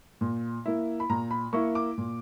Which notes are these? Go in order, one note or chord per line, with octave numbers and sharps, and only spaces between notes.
A#2
A#3 E4
B5
A#2 A#5
B5
A#3 E4 C#6
D6
A#2